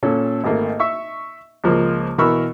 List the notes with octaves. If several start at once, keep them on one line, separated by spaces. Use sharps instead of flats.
A#2 C#4 A4
G#1 A3 A#3
E5 C#6 E6
C#2 F3 A#3
B2 E3 A#4 B5 C#6 E6